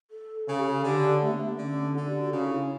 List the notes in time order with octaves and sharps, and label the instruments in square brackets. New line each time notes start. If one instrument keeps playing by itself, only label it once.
[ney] A4
[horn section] C#3 [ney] A4
[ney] G4
A4
[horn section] D3 [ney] G4
[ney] A3
B3
A3
B3
[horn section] D3 [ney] C#4
[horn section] D3 [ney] A4
[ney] G4
F#4
[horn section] C#3 [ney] F#4
[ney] D4
E4